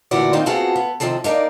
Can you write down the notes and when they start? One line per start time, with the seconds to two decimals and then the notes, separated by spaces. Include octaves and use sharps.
0.11 D2 A#2 E3 B3 F#4 D5
0.33 D#3 C4 D#4 F4
0.46 B3 C4 F4 F#4 G#4 A4
0.76 B3
1.00 C3 D#3 F3 C4 A4
1.24 A#3 D#4 A4 A#4 D5